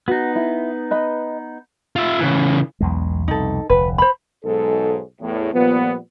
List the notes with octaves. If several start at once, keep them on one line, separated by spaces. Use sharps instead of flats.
B3 D#4 F#4
E4
B4 D#5 B5
F4 E5
C#3 E3
B1 E2 G#3
C2 F2 B2 D#4 A4
F1 D2 B4
C5 B5
B1 G#2 A4
E2 A2
A#2 F3 G3 B3